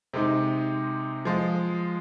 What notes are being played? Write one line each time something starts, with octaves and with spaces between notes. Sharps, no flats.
C3 G#3 C4 D#4
F3 G#3 F4